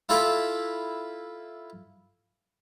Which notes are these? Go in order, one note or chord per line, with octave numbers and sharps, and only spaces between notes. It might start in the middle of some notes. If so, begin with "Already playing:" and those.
E4 F4 A4 B5 D6